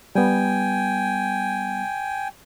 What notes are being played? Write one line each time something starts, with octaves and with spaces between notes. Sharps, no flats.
G3 B3 G5 G#5